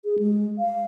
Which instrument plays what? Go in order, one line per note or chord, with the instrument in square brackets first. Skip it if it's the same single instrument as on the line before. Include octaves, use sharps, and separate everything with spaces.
[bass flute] G#4
G#3
F5